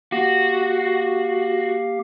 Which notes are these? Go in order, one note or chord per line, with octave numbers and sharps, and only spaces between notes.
A#3 F#4 G4 F5